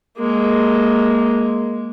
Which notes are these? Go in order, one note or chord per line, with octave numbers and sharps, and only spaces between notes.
G#3 A#3